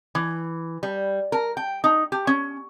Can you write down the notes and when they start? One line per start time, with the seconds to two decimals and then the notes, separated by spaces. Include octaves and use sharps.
0.15 E3
0.83 G3
1.32 A#4
1.57 G5
1.84 D#4
2.12 G4
2.27 C#4